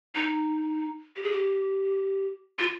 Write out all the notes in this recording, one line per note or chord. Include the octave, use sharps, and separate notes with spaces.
D#4
G4
G#4
G4
F4